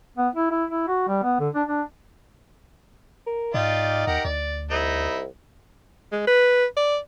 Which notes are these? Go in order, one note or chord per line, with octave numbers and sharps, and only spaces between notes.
B3
E4
E4
E4
F#4
G3
B3
D3
D4
D4
A#4
G#2 D#4 F4 G4 D5
D#2 G4 A#4 F#5
D2 D5
C2 D#4 E4
G#3
B4
D5